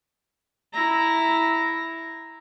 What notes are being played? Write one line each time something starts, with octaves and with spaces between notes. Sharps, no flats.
E4 A#5